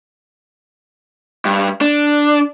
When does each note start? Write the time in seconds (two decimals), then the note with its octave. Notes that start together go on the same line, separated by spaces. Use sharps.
1.45 G2
1.81 D4